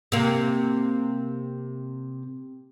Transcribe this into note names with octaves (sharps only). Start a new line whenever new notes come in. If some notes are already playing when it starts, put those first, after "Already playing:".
C3 A#3